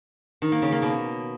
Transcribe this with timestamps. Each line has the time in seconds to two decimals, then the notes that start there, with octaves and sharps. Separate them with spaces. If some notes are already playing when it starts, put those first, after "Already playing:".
0.42 D#3
0.52 A#3
0.62 C#3
0.72 A#3
0.82 B2